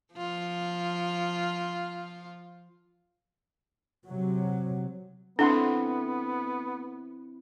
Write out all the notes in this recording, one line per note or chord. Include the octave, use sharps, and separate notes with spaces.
F3 F4
C3 F#3
B3 C4 D4 E4 A4 F#5 C6